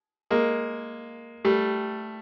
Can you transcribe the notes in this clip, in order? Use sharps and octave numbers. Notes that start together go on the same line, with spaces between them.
G#3 A#3
G3 A3